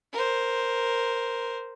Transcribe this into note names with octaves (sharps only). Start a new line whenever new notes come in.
A#4 C5